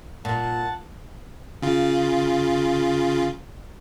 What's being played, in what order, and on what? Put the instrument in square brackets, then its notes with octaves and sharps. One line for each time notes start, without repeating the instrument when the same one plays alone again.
[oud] A#2 [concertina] F#5 A5
[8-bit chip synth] C#3 F4